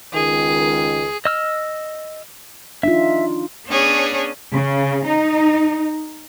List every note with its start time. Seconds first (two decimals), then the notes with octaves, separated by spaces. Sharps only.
0.14 C#2 D#3 G#4
1.25 D#5 E6 F6
2.83 D4 D#4 F4 E5
3.67 B3 C#4 D4 G#4 C#5
4.53 C#3
5.07 D#4